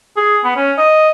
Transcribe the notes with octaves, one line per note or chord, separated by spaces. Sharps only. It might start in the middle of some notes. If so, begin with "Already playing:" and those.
G#4
B3
C#4
D#5